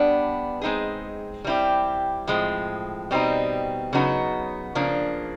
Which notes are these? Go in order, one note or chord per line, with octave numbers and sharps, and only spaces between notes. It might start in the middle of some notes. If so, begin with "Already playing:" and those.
Already playing: G3 B3 D4
G#3 C4 D#4 G#4
G3 C4 E4 G4
A2 F3 G#3 C4
B2 G3 C4 D#4
C#3 F#3 B3 D#4 F#4
C#3 F3 A#3 D4